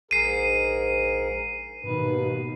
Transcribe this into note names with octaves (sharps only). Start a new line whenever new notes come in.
A#1 G#2 G#4 A#4 C7 D#7
D#2 G#2 B2 D#3 B4